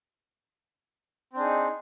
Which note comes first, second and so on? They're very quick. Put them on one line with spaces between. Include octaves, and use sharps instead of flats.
C4 D4 G#4 D#4